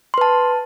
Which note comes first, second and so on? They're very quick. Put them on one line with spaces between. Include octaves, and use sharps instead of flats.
C6 B4 A5